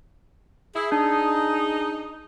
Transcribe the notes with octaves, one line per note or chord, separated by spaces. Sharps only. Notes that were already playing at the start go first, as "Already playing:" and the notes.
E4 G#4
D4 D#4